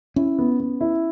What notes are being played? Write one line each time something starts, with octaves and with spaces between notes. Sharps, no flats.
C#4 E4
B3
B3
E4